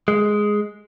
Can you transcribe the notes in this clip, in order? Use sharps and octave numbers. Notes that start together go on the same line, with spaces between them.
G#3